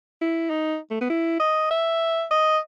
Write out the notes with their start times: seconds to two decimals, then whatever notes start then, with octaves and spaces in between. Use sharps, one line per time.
0.21 E4
0.50 D#4
0.90 A3
1.01 B3
1.10 E4
1.40 D#5
1.71 E5
2.31 D#5